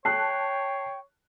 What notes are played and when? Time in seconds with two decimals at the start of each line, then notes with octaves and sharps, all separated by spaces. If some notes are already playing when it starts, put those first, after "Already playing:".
0.05 C#5 G5 A5 F#6 C7